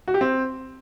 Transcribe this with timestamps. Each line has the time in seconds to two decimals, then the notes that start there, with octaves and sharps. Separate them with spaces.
0.08 F#4
0.14 G4
0.21 C4